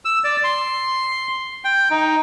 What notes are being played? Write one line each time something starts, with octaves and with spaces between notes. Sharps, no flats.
E6
D5
C6
G5
D#4